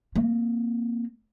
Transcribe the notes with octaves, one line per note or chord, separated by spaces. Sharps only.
A#3 C4